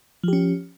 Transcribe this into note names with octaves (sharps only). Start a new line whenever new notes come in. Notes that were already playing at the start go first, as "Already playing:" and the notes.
F3 C#4 G4